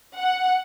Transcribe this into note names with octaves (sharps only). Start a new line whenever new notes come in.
F#5